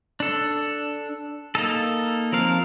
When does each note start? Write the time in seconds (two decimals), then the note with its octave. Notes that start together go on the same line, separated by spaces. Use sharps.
0.20 D4 A4
1.55 A#3 D#4 A4
2.33 F3 C4 A#4 F5